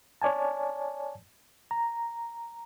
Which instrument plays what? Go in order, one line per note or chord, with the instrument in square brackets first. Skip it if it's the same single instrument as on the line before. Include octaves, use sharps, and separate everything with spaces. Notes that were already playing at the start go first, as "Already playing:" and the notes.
[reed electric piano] C#5 D5 G#5 A5
A#5